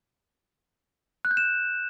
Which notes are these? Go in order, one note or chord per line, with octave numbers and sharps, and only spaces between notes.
F#6
G6
E7